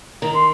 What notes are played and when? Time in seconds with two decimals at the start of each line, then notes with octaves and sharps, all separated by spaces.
0.22 D#3 A#5
0.34 C6